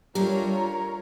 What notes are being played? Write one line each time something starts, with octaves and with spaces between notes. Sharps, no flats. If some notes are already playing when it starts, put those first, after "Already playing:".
G3 A3 D4 F4 G4 A#4 C#5 A#5